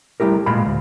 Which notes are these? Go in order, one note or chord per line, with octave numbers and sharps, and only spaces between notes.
G3 A3 E4 G4 A#4
A#2 G#3 F5 B5
D2